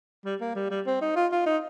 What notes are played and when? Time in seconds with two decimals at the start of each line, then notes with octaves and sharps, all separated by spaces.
0.25 G3
0.41 A#3
0.55 G3
0.70 G3
0.86 C4
1.02 D#4
1.16 F4
1.32 F4
1.46 D#4